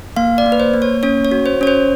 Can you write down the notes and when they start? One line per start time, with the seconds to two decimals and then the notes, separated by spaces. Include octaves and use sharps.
0.16 A#3 F5
0.38 D5
0.46 A#3
0.52 B4
0.60 C5
0.74 A#3
0.82 C#5
1.03 C#4 C#5
1.25 C#5
1.32 F#4
1.46 C5
1.61 C#4 C#5
1.67 C5